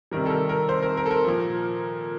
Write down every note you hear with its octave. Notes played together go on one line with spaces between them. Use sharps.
C3 D#3 G3 A#4
A4
A#4
A#4
C5
A#4
A#4
A4
A#4
A#2 F3